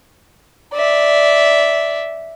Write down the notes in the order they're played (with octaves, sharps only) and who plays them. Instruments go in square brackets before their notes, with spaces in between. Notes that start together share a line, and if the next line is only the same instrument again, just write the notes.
[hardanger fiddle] D5 E5